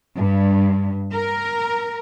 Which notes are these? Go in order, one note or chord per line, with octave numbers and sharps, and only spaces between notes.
G2
A#4